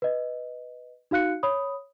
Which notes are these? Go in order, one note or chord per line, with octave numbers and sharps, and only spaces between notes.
B4 D#5
D#4 F#4 F5 F#6 C#7
C#5 B5 D#6